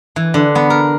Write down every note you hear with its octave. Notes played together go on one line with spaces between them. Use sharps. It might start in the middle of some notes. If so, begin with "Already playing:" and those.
E3
D3
B3
A#4